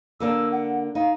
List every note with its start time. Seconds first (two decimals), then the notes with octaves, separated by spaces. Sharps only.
0.20 D3 A#3 D4 E6
0.52 F#5
0.95 D#4 F5